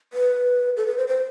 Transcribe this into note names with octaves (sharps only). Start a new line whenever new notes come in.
B4
A4
B4
C5
C5